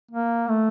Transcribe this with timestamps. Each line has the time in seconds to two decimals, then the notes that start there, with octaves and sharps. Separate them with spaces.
0.11 A#3
0.49 A3